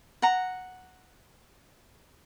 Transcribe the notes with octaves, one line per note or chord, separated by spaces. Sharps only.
F#5 A#5